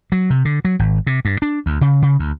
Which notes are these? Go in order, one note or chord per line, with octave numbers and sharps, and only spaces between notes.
F#3
C3
D3
F#3
G#1
C3
G2
D4
D2
C#3
C#3
D2